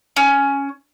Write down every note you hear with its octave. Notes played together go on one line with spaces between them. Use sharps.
C#4